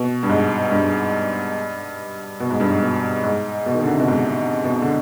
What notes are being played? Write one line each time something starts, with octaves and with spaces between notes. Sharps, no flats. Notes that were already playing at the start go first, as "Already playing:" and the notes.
Already playing: B2
G2
G#2
G2
B2
G#2
G2
G#2
B2
G#2
B2
D#3
D3
C3
B2
G#2
B2
D3